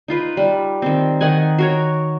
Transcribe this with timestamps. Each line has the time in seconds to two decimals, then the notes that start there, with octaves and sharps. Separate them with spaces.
0.08 D#4 F4 B4
0.37 G3
0.82 D#3 C4
1.21 D#3 D#4 F#5 G#5
1.58 F#4 A#4 C#5